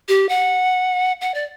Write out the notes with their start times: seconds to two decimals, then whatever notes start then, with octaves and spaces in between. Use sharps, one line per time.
0.09 G4
0.29 F#5
1.21 F#5
1.34 D5